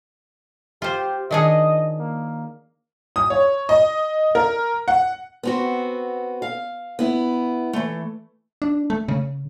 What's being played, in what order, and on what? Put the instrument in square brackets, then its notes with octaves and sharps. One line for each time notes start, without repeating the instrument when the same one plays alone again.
[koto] F4 C5 [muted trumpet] G4
[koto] D#3 D4 G#4 [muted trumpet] D#5
[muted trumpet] A#3
[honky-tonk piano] D#6
C#5
D#5
A#4
F#5
[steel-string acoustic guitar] B3 C4 F#4
F5
B3 E4
E3 A3
[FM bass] D4
A3
C#3